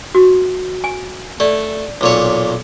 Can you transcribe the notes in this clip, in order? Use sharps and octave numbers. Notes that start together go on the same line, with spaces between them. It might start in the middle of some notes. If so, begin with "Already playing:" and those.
F#4
G#5
A3 D5
B1 A#2 C#5